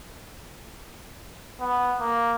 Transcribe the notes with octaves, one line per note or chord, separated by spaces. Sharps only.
B3
A#3